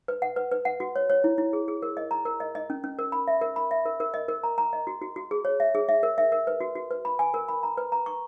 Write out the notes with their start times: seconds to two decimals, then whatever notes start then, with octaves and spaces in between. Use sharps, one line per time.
0.08 B4
0.22 F#5
0.36 B4
0.51 B4
0.65 F#5
0.80 F#4
0.96 C#5
1.10 C#5
1.24 E4
1.38 E4
1.53 G#4
1.68 G#4
1.82 A#4
1.97 D#5
2.11 A#5
2.25 A#4
2.40 D#5
2.55 D#5
2.70 C#4
2.84 C#4
2.99 A#4
3.12 B5
3.28 E5
3.41 A#4
3.56 B5
3.71 E5
3.86 A#4
4.00 A#4
4.14 D#5
4.28 A#4
4.43 A#5
4.58 A#5
4.73 D#5
4.87 F#4
5.02 F#4
5.16 F#4
5.31 G#4
5.45 C#5
5.60 E5
5.75 G#4
5.89 E5
6.03 A#4
6.18 E5
6.32 A#4
6.47 B4
6.61 F#4
6.75 F#4
6.91 B4
7.05 B5
7.19 G#5
7.34 A#4
7.48 B5
7.63 A#5
7.77 B4
7.92 A#5
8.06 C#6